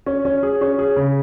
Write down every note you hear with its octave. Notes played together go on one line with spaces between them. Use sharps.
C#4
C#4
G#4
C#4
G#4
C#3